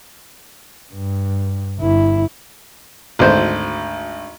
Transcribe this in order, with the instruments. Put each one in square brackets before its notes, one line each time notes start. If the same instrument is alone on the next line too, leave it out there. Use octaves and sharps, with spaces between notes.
[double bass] G2
G1 E4
[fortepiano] G#1 D2 C5